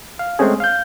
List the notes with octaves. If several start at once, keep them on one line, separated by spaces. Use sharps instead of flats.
F5
G#3 A3 C4 C#4 G#4
F5 G6